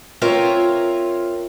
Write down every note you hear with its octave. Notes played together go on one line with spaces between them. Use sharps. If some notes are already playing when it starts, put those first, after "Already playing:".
C4 F4 A#4 C#5 E5